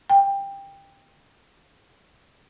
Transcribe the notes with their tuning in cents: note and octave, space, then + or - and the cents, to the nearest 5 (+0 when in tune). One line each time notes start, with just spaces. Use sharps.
G5 +15